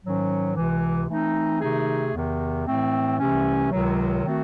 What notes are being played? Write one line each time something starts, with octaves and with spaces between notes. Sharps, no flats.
G#2 D#3 F#3 C#4
C#2 C3 E3
E3 A3 C4 D#4
C3 D#3 A3 D#4 G#4
E2 C3 D#3
A2 E3 A3 C4
C2 C3 E3 A3 C#4
C#2 C3 D#3 F#3
D#3 A3 C4 F#4